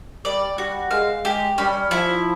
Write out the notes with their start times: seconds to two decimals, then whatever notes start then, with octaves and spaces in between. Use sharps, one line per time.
0.25 G3 D5
0.58 G3 F#4
0.91 G#3 F5
1.25 G#3 G4
1.58 G3 C#4
1.91 F3 E4